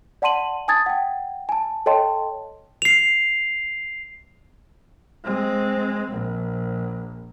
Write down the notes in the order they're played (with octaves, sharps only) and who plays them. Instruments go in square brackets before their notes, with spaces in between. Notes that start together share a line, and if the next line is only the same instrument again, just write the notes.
[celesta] D5 F#5 A5 C6 D#7 F#7
G#5 A5 D#6 G#6 A6
F#5 G5
G#5 A5
A4 C#5 D#5 G5 A5 C6
[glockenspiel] C7 F7
[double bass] G#3 C4
A#1